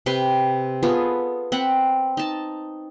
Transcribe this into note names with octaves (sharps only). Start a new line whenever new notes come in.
C3 B4 G5 C6
B3 F4 G#4 A4
C4 F#5 B5
D#4 A5